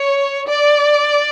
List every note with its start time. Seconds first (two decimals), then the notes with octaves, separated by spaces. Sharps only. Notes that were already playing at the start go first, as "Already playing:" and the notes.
Already playing: C#5
0.48 D5